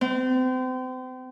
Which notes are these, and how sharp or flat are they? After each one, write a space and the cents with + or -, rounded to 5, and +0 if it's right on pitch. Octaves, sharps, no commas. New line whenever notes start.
C4 -35